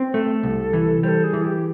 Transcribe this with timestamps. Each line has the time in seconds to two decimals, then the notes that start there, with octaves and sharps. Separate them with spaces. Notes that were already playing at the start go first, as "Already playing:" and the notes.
Already playing: C4
0.13 A3 A4
0.43 C2
0.73 E3
1.03 G3 C5
1.08 A4
1.24 G#4
1.33 E3
1.44 G4